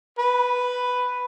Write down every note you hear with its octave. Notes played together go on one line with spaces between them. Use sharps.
B4